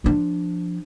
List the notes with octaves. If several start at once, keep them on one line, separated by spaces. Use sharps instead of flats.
F3 D4